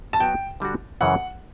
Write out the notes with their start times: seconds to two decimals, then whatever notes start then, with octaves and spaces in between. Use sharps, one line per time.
0.13 A5
0.20 F#3 B3 F#4 G5
0.60 D3 G3 D4 F#4
1.01 F#2 C#3 E3 F#5